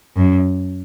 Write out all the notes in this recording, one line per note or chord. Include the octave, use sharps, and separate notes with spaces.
F#2